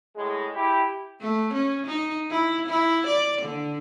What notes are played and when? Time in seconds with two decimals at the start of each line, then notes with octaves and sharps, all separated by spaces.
0.16 A2 G#3
0.54 E4 G4
1.20 A3
1.53 C#4
1.86 D#4
2.31 E4
2.68 E4
3.06 D5
3.41 D3